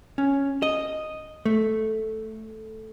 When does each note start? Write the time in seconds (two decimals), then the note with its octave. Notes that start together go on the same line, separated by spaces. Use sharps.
0.18 C#4
0.62 D#5
1.45 A3